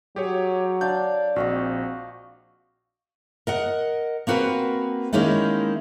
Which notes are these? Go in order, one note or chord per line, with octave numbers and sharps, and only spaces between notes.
F#3 G4 G#4 C#5
D4 D5 F5 G6
A#1 C4 F#4 D#5 F5
A#4 D#5 F#5
A#3 C4 F#4 A#4 B4
D#3 G#3 A#3 C#4 D#4 E4